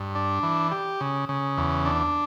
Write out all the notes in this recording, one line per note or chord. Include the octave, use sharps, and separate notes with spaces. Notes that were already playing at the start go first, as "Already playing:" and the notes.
Already playing: G2
D4
E3
G4
C#3
C#3
E2
D4